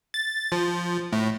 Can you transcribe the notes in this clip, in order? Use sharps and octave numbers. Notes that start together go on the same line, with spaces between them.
A6
F3
A2